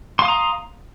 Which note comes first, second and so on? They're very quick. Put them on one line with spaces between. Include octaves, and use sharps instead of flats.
C6 F5 D#6 A#5